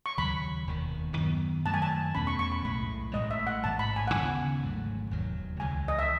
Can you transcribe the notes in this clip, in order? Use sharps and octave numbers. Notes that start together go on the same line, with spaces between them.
C#6
D#2 C#3 F#3 B5
E1 D#2 D#3
F#2 D#3 F#3 B3
F#2 D#3 F#3 A3 A5
G#5
A5
E2 B2 A3 C#4 B5
C#6
C#6
B5
B1 A2 G#3 B5
A1 A2 G#3 D#5
E5
F#5
A1 G#2 E3 A5
B5
G#5
F#5
D#2 C#3 E3 B3 G#5
G#1 G#2 F#3 A3
E1 D#2 D#3 F#3
C#2 C#3 E3 G#3 G#5
D#5
E5